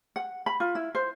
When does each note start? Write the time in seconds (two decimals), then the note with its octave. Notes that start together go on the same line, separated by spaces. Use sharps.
0.16 F#5
0.46 B5
0.60 F4
0.75 E4
0.95 C5